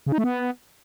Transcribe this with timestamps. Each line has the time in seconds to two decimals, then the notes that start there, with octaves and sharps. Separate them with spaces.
0.06 C#3
0.12 D#4
0.18 A3
0.24 B3